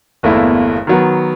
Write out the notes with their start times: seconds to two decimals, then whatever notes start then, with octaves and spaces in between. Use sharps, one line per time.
0.23 G1 E2 A3 A#3 E4
0.87 D#3 F#3 B3